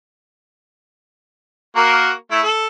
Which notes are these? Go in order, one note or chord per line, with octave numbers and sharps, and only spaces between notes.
A#3 F#4 A#4
A3 E4
A4